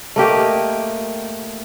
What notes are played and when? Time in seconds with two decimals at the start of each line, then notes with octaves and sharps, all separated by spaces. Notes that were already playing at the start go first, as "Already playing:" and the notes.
0.16 A3 A#3 G4 D#5